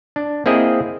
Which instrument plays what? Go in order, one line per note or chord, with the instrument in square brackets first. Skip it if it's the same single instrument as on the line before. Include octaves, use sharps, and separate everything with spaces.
[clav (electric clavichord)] D4
A#3 C4 E4 G#4 D#5